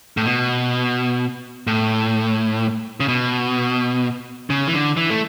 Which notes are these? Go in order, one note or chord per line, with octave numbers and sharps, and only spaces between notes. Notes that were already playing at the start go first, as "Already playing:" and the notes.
A2
B2
A2
C#3
B2
C#3
E3
D3
E3
A3